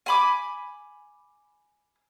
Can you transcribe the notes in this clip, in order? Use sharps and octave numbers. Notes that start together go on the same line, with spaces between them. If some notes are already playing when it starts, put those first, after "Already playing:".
G#5 B5 D6